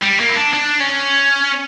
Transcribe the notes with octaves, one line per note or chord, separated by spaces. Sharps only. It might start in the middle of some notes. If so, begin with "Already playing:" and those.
G3
A#3
E4
D4
D4
C#4